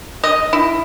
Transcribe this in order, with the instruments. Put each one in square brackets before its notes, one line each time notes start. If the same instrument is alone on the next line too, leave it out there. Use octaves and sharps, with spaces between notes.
[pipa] D#5
E4